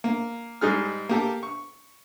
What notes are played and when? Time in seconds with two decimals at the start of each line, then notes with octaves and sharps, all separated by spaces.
0.04 A#3
0.61 G#2 G3 D#4 G#4 F6
1.09 A#3 G4 A4
1.43 C#6